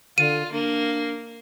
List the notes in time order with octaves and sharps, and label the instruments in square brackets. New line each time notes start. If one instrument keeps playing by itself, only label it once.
[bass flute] D3 [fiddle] F4 [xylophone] D#7
[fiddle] A#3 [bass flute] D4